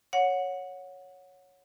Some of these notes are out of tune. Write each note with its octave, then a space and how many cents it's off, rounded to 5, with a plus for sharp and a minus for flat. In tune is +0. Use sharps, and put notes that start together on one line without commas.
C#5 +0 F#5 -20